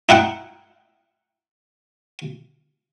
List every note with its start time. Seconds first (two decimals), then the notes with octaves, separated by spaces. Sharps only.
0.09 D#4 E4 F#5 G5